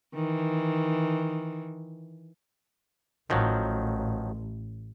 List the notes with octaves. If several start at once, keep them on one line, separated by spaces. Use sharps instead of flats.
D#3 E3
A1 D#3 F3 F#3